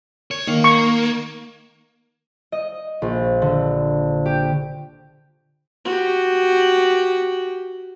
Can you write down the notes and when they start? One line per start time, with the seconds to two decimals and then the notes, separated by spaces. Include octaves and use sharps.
0.31 C#5
0.47 D#3 A#3
0.64 C#6
2.52 D#5
3.02 A#1
3.42 D3
4.26 G4
5.85 F#4 G4